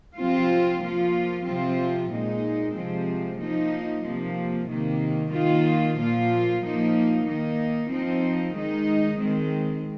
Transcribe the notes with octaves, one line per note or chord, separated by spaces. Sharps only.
C3 F3 C4 F4
F3 A#3 F4
C3 F3 C4 F4
A#2 G#3 D#4
C3 F3 G#3 C4
F3 A#3 D#4
C3 F3 A#3
C3 D#3 A#3
D#3 A#3 F4
A#2 F3 A#3 F4
F3 A#3 D#4
D#3 A#3 D#4
F3 C4 D#4
D#3 G#3 D#4
D#3 G#3 C4